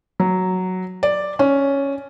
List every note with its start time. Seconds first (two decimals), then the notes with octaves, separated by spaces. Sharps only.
0.20 F#3
1.03 D5
1.39 C#4